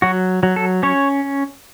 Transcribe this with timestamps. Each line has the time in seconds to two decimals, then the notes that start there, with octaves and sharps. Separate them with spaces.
0.02 F#3 F#4
0.43 F#3
0.56 A4
0.83 C#4 C#5